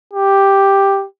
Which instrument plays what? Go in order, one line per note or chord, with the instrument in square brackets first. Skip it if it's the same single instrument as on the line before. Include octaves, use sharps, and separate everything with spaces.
[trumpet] G4